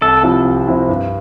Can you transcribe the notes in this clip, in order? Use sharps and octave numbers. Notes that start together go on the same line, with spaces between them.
C2 A4
C3 F3 C4 E4
C2
C3 F3 C4 E4
G2